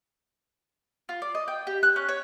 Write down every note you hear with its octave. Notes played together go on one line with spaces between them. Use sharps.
F4
D5
D#5
G5
G4
F#6
C#4
C#5